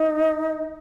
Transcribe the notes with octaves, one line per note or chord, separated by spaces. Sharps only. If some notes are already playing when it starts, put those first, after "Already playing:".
Already playing: D#4